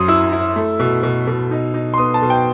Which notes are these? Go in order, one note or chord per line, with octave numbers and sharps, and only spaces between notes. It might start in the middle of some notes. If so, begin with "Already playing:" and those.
Already playing: F#2 F#3 C6 D#6
E4 E6
E4
A3
B2
B2
B2
D#4
D#4
C6
B3 D#6
A5
B2
G5